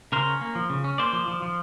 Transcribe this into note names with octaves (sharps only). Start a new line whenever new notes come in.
C#3 A#4 C5
C#4
A#3
F3
C#3
C#4
A#3 C5 D5
F3
F3
F3